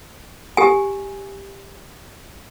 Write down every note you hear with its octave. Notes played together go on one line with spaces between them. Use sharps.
G4 G#5